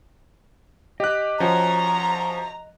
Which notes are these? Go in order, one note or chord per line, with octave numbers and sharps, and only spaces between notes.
G4 D#5 F#6
F3 C#4 F#4 A#5